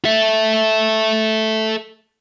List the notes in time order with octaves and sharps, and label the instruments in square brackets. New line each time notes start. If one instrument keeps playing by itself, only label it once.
[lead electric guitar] A4 E5